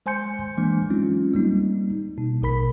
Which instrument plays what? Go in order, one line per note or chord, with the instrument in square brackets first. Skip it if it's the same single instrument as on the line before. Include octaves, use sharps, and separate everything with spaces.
[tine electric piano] G#3 C5 G#5 C6 G6 C#7
E3 G#3 A#3 D4
F#3 G#3 C4 C#4 D#4 F4
G3 A#3 D#4
B2 D#4
A#1 B2 A#4 B5 B6